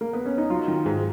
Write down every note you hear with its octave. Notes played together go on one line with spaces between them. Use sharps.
A#3
B3
C#4
D#4
F#3 F4
D#3
G#2